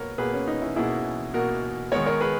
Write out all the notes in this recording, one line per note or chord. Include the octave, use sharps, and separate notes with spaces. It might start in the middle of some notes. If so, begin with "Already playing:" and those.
Already playing: B2 A#3 A#4 B4 C#5
B2 A#3 G#4 B4
C#4
D#4
C#4 E4
B2 A#3 E4 G#4
B2 A#3 F#4 A#4
D#3 G#3 B3 A#4 C#5
A#4 C#5
G#4 B4